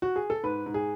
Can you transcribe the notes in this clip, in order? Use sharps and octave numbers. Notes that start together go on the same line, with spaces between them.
F#4
G#4
A4
G#2 B4
G#2
G#4